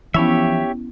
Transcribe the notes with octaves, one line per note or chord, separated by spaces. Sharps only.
E3 F3 B3 C#4 E4 G4 C#5 E5